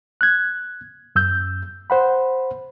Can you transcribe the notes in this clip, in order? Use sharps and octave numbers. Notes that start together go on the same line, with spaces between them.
F#6 G#6
F#2 E6 G6
C5 F#5 B5